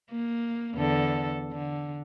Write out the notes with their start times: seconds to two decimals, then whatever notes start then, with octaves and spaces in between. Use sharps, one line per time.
0.11 A#3
0.75 E2 D3 A4
1.52 D3